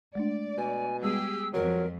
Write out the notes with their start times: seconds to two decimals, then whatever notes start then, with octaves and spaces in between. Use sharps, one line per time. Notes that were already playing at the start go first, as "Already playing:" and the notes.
0.15 G#3 A3 D4 D5
0.58 B2 G#5
1.02 G3 G#3 B3 G4 G#4 E6
1.54 F2 F#3 A#4